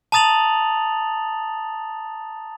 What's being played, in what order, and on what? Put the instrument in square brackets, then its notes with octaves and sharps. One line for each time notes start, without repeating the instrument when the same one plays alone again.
[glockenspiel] A5 A#5 D#6 A6 F7 F#7